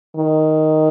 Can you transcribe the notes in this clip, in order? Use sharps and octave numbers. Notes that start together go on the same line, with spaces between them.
D#3